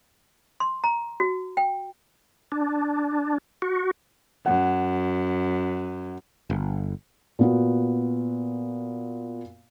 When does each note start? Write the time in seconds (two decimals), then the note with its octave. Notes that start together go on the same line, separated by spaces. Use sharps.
0.60 C6
0.84 A#5
1.20 F#4
1.57 G5
2.52 D4
3.62 F#4
4.46 F#2 F#5
6.50 G1
7.39 A#2 B3 F#4